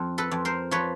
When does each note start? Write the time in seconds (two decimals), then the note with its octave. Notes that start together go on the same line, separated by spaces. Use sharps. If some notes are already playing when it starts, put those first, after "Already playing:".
Already playing: F2
0.18 A4 B4
0.31 F2
0.45 A#4 C5
0.71 F3 B4 C#5